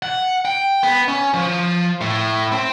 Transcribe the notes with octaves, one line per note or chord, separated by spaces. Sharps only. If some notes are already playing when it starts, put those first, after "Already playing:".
F#5
G5
B3
C#4
F3
A2
C4